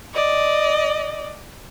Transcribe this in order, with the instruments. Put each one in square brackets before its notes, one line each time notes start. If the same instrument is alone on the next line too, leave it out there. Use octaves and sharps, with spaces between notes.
[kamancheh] D5 D#5